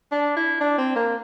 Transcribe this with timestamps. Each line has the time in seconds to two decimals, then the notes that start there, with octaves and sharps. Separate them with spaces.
0.12 D4
0.36 E4
0.60 D4
0.78 C4
0.96 A#3